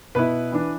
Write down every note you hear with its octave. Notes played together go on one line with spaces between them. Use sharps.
B2 B3 E4 B4
E3 D4